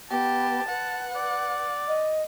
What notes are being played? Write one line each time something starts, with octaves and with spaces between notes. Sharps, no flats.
B3 G4 A5
B4 F#5
D5
D#5